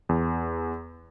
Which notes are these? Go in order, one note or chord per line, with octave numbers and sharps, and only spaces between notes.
E2